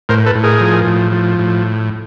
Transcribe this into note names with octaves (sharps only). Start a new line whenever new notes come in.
A2 A#4 C5
A4 B4
A2
G#4 A#4
F3
A2
F3
A2